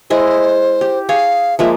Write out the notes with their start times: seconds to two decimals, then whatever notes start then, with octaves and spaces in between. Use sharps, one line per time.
0.10 G#3 E4 C5 D#5
0.81 G4
1.09 G#4 C#5 F5
1.59 F3 G#3 A#3 E5